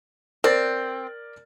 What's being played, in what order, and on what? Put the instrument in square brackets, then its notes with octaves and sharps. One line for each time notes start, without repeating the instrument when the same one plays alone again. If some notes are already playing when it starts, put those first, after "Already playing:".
[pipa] C4 [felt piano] A#4 D5 A6